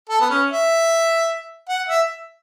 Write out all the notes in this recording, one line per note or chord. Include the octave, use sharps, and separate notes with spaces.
A4
B3
C#4
E5
F#5
E5